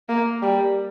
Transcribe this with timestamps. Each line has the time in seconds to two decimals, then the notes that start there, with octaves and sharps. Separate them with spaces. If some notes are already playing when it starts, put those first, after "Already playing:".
0.09 A#3
0.42 G3